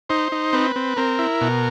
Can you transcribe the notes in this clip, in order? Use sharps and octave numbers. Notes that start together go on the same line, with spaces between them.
D#4 C5
D#4
C4 B4
C4
C4 A#4
E4
B2